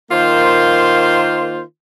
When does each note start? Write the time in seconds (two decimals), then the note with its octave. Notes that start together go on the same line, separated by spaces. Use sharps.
0.11 D#3 A#3 F4 C5